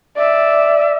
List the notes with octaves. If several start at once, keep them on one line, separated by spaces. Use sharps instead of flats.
D5 E5